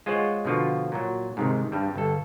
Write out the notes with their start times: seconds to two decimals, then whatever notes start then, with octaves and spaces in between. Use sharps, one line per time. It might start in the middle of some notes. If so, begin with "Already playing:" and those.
0.06 G#3 F4 G#4 C5 C#5 F#5
0.45 B2 D3 F3 F4 F#4
0.92 A#2 F#3
1.37 G#2 C3 D#3
1.72 G2 G3
1.96 G1 A4